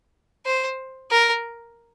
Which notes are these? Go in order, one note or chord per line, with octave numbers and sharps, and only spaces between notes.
C5
A#4